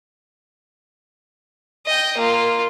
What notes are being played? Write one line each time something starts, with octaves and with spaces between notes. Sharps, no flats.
D#5 G5
A#3 F4